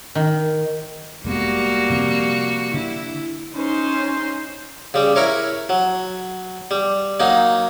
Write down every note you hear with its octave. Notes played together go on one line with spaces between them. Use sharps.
D#3
F1 G3 G#3 A#3 B3 F#4
C3 F3 C4
D3 D4 E4
C#4 D#4 C5
C#3 G3
E4 A#4 C#5
F#3
G3
F#3 A#3 D#4